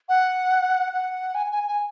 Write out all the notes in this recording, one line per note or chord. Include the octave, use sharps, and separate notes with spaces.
F#5
F#5
G#5
G#5
G#5